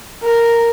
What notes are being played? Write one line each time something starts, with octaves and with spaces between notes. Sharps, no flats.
A#4